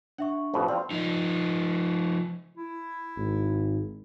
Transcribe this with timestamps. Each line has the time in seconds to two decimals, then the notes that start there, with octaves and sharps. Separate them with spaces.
0.18 D4 E5 F#5 C#6
0.54 A1 F2 B2
0.68 C4 F4 D5 C6
0.91 F3 D#4
2.57 E4
3.17 G#1